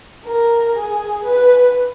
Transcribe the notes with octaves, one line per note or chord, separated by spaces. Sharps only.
A#4
G#4
B4